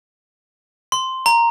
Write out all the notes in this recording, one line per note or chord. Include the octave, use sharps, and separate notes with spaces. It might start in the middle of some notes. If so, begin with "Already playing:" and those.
C6
A#5